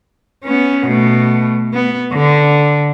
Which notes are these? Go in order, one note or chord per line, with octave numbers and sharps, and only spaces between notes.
B3 C#4
B2 A3
B3
D3